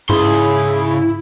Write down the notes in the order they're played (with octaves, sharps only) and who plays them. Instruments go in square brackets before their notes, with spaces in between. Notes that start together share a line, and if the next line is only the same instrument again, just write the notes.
[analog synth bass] G#2 [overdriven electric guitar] C#3 C6 [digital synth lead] E4 [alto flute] G#4